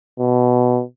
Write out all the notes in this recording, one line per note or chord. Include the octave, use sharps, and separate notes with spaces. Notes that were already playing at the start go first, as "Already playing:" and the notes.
B2